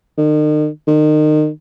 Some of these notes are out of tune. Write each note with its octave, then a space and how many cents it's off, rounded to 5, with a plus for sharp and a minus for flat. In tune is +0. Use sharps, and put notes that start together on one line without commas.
D#3 -40
D#3 -30